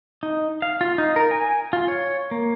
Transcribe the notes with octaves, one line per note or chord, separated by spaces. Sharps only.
D#4
F5
F4
D#4
A#4
G#5
F4
C#5
A#3